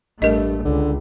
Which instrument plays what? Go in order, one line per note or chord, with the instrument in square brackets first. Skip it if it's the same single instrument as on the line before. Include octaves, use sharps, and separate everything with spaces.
[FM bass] A1 [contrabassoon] G2 [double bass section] A3 [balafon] A#4 D#5
[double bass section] C#2 [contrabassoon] D3